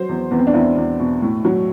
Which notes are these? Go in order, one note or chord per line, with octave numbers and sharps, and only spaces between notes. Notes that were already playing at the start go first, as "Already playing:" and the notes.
Already playing: F#3 C5
E2
E2 B3
C4
D4
E2 E4
E2
B2
A2
F#3